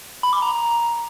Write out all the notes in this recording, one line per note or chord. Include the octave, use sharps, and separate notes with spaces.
B5
D6
A#5